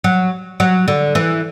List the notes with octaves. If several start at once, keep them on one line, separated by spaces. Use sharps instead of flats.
F#3
F#3
D3
E3